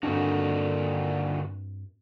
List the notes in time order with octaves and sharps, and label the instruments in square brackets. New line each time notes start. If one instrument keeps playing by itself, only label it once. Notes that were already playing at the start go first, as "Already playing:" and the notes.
[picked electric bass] G2 C4 D4 [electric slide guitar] A#2 D#3 F#4 [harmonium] D3